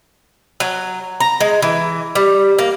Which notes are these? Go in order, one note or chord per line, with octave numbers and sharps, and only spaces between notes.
F#3
A#5
G#3
E3
G3
A#3